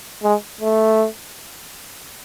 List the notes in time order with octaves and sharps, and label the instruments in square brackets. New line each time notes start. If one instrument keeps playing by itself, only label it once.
[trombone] G#3
A3